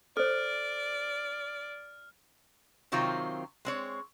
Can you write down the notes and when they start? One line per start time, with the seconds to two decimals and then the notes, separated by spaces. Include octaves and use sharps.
0.17 A4 C5 D5 F6
2.92 C3 D#3 F#3 C4 F4
3.65 G#3 C4 C#5